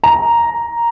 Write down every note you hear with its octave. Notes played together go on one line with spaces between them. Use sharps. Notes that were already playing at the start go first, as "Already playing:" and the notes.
A#5